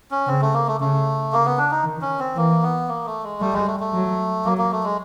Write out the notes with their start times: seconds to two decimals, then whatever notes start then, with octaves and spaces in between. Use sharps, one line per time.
0.11 C#4
0.27 C#3 C4
0.41 A3
0.54 A#3
0.68 A3
0.80 C#3 A3
1.33 C#3 A#3
1.45 B3
1.58 D4
1.71 D#4
1.84 D#3
2.02 C#4
2.19 C4
2.36 E3 A#3
2.63 B3
2.88 A#3
3.06 A3
3.23 G#3
3.41 G3 A3
3.53 G#3
3.67 A3
3.80 A3
3.93 F#3
4.45 F#3 A#3
4.58 A#3
4.72 A3
4.84 G#3